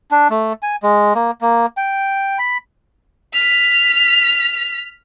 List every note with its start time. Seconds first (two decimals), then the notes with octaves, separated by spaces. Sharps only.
0.11 D4
0.30 A3
0.62 G#5
0.83 G#3
1.15 A#3
1.41 A#3
1.77 G5
2.38 B5
3.33 F6 B6